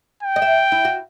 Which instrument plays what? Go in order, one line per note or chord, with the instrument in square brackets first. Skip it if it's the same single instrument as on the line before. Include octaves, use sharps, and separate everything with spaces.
[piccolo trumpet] G5
[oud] D#5
E5
E4
F#4